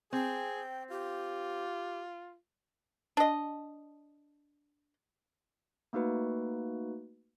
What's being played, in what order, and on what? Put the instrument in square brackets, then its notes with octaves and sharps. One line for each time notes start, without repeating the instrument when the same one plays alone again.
[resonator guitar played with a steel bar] C4 [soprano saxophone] G#4 [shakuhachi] G5
[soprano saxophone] F4 [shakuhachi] G4
[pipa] D4 D#5
[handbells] A3 A#3 D#4 F#4 B4